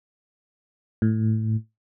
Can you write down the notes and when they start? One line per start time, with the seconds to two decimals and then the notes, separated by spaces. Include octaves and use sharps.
1.02 A2